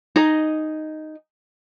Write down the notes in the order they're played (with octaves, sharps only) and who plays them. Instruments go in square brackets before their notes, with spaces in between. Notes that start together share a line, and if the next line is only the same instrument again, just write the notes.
[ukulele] D#4 G#4 D#5